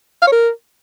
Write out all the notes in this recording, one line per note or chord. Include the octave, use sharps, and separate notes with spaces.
F5
C#5
A#4